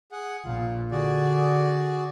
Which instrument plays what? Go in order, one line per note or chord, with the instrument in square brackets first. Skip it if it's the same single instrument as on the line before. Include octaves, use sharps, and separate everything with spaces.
[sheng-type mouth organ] G#4 F#5
[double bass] A#1 A#2 [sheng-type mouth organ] F4
[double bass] D3 [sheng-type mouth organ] F#4 G#4 D5